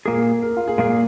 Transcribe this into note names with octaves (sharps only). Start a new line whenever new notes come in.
A#2 A#3 G#4 A#4
A#4
F4
G#4
A#2 A#3 G#4 A#4